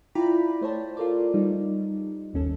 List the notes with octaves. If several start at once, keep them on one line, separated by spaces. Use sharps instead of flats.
E4 F4 D5 G5 A#5 B5
A3 C5 C#5 A5
F4 A4 A#4 C5 D5
G3 D#4
G1 D#2 C#4 A4